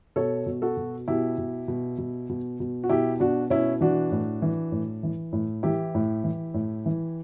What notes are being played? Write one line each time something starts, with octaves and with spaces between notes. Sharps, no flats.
B2 A4 C#5
B2
F#4 A4
B2
B2 E4 G4
B2
B2
B2
B2
B2
F#4
B2 E4 G4
B2 D4 F#4
B2 C#4 E4
E3 D4 F#4
A2
E3
A2
E3
A2
E3 E4 G4
A2
E3
A2
E3